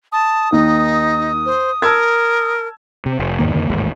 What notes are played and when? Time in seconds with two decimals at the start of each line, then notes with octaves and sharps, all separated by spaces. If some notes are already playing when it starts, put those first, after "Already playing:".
0.12 A5 D#6
0.52 D#2 A#3 D#4
1.46 C5
1.82 A#4 A5 E6 G#6
3.06 C3
3.19 F1
3.39 E2 G#2 D#3 A#3
3.54 F2 D3 D#3 A#3
3.70 A1 D#2 G#2